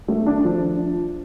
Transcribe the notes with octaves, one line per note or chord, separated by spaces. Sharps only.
A3
D4
F3